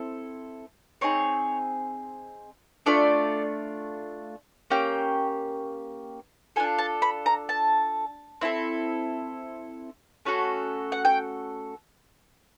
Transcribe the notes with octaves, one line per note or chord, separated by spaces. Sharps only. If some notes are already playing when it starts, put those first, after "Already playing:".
Already playing: C4 E4 A4
C4 D#4 G#4 C#5
A3 D4 F4 D5
A#3 C#4 G4 G5
D4 F4 A4 G#5
A5
B5
A#5
A5
C4 E4 A4
A3 C#4 F#4 A4
F#5
G5